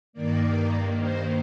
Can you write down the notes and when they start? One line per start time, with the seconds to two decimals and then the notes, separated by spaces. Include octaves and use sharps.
0.13 G2 D#3 A#3 D5
0.98 C5